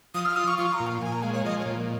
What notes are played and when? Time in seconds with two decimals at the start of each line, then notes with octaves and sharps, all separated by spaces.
0.14 F3 D#6
0.25 F6
0.36 F4 D#6
0.48 C#6
0.58 F3 C#6
0.73 A#5
0.80 A#2
0.87 F5
1.02 A#2 G#5
1.13 A#5
1.23 G#3 F5
1.33 C#5
1.44 F3 D#5
1.59 C#5
1.66 A#2